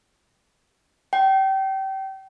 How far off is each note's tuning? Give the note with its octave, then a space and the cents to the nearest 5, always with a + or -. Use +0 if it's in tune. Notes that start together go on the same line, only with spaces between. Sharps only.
G5 -30